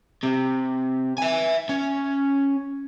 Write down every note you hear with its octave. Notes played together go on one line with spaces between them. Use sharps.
C3
E5 G#5
C#4